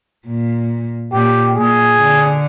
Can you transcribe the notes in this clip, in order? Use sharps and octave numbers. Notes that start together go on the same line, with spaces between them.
A#2
A#2 G4
A#2 G#4
D3